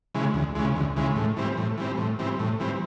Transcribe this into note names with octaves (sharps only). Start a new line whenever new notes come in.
C#3 E3 G#3
D2
C#3 E3 G#3
D2
C#3 E3 G#3
A2
E3 G3 C4
A2
E3 G3 C4
A2
E3 G3 C4
A2
E3 G3 C4